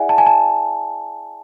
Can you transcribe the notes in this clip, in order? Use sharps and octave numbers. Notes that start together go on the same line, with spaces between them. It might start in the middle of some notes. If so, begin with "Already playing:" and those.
Already playing: E4 G#4 D5 E5 F#5 G#5
A5
G#5
A5